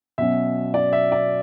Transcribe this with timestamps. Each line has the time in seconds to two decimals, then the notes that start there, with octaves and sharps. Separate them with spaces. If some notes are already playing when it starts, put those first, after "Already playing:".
0.18 B2 F#3 C#4 E5
0.74 D5
0.93 E5
1.12 D5